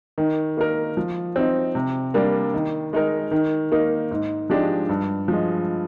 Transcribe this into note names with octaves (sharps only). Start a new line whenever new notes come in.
D#3
A#3 D#4 A#4
F3
C4 D#4
C3
G3 A#3 D4
D#3
G#3 D#4 A#4
D#3
A#3 D#4
G#2
F3 G#3 D4 G4
G2
F3 G#3